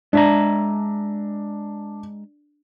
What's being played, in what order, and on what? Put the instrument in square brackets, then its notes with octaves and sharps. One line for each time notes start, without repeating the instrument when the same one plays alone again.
[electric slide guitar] G#3 E5 A#5 [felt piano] D4